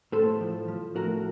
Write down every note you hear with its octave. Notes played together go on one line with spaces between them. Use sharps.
A2 A4 C5
F3
F3
A2 F#4 A#4